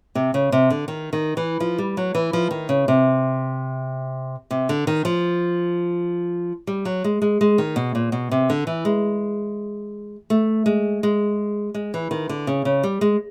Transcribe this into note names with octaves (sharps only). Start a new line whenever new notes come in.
C3
C#3
C3
D3
D#3
D#3
E3
F3
G3
F#3
E3
F3
D#3
C#3
C3
C3
D3
D#3
F3
G3
F#3
G#3
G#3
G#3
D#3
B2
A#2
B2
C3
D3
E3
G#3
A3
G#3
G#3
G#3
E3
D#3
D3
C#3
C#3
G3
G#3